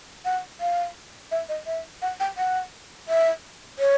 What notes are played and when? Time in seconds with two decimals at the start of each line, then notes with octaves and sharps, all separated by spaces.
0.25 F#5
0.61 F5
1.31 E5
1.49 D#5
1.66 E5
2.02 F#5
2.20 G5
2.37 F#5
3.09 E5
3.79 C#5